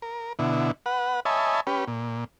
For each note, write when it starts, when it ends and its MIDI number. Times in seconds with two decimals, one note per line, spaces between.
0.02 0.33 70
0.39 0.71 47
0.39 0.71 50
0.39 0.71 64
0.86 1.20 71
0.86 1.20 78
1.25 1.60 73
1.25 1.60 75
1.25 1.60 76
1.25 1.60 80
1.25 1.60 81
1.25 1.60 83
1.67 1.85 61
1.67 1.85 67
1.67 1.85 71
1.87 2.24 46